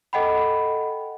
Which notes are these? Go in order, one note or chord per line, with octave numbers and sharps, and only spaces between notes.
A4 D#5 F#5 G5 B5